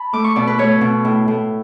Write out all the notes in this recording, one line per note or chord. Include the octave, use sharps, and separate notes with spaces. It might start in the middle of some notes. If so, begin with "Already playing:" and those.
Already playing: A5 B5
A3 D6
C#6
B2 D5
B4
A3 C#5
B2
A2
A2